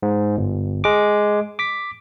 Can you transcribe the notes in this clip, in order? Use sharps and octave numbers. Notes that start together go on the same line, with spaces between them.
G#2
G1
G#3 D6
D6 B6